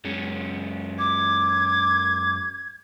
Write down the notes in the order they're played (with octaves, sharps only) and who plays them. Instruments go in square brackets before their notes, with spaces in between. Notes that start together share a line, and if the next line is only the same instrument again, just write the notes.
[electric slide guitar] F#2 G#3 C#4
[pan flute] D6 [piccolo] G#6